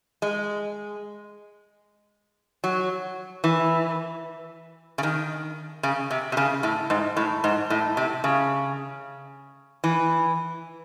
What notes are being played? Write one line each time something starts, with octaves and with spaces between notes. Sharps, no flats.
G#3
F#3
E3
C#3
D#3
C#3
C3
C3
C#3
A2
G#2
A2
G#2
A2
C3
C#3
E3